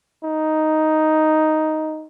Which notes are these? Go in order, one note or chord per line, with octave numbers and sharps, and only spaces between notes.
D#4